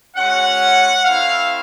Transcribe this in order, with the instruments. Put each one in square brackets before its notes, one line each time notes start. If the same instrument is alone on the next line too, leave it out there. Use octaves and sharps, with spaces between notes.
[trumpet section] G#3 C#4 F#4 F#5
A3 C4 E4 F5